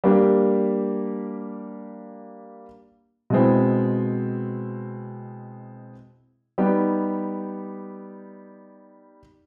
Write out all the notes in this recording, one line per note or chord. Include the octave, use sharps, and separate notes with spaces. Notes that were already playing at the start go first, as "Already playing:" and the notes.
G3 A#3 D4 G4
B2 G#3 C4 E4
G3 B3 D#4 G4